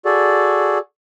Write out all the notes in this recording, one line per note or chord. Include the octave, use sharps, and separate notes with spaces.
F#4 G#4 A4 D5